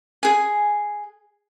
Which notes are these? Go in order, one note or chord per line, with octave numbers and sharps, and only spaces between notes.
G#4 G#5